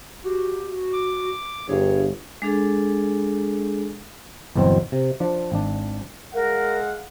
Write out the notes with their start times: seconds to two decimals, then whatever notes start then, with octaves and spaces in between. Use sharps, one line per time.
0.24 F#4 G4
0.93 D6
1.69 G1 G2 G#4 C#5
2.42 G#3 D4 G#4 A4
4.56 G1 E2 B2 F#3 C4
4.92 C3
5.20 F3 D4
5.52 G#1 D4
6.34 G#3 A#4 F5 F#5